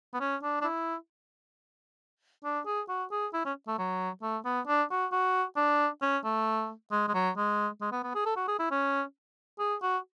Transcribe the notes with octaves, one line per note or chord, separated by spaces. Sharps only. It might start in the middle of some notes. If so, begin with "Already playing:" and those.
B3
C#4
D4
D4
E4
D4
G#4
F#4
G#4
E4
C#4
A3
F#3
A3
B3
D4
F#4
F#4
D4
C#4
A3
G#3
G#3
F#3
G#3
G#3
B3
B3
G#4
A4
F#4
G#4
E4
C#4
G#4
F#4